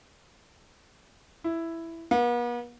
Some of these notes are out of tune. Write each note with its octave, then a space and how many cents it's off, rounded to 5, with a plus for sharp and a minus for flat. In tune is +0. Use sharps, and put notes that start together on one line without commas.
E4 +5
B3 -45